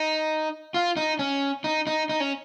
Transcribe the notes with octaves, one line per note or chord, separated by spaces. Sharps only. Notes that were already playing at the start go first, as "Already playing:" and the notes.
Already playing: D#4
F4
D#4
C#4
D#4
D#4
D#4
C#4